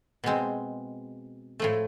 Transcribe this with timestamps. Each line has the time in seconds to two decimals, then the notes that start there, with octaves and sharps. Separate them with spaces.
0.24 B2 G#3 C4
1.60 A2 F3 A3